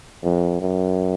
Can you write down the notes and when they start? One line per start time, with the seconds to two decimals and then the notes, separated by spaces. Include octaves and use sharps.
0.23 F2
0.61 F#2